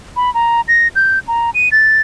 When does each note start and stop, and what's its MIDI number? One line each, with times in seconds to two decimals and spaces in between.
0.16 0.32 83
0.34 0.61 82
0.68 0.88 94
0.96 1.19 91
1.28 1.50 82
1.54 1.69 99
1.72 2.01 93